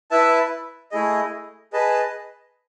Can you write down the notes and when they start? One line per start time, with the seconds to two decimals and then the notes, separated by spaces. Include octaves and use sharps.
0.11 E4 B4 E5 A5
0.92 A3 E4 G#4 D#5
1.73 G#4 B4 D#5 A5